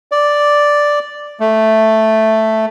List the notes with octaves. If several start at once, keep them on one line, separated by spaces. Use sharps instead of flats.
D5
A3